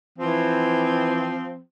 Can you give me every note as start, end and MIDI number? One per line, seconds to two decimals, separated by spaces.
0.19 1.41 52
0.19 1.57 53
0.19 1.57 60